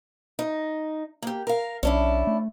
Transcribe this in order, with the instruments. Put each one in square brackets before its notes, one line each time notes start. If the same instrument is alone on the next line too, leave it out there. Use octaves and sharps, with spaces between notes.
[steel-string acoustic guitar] D#4
A#3 G4
A#4 F5
[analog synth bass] B1 [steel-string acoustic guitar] C#4 D4 E4
[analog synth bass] A3